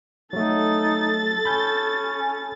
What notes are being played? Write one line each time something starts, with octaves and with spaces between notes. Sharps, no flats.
F#3 A3 D#4 A4 A6
C#4 B5 G6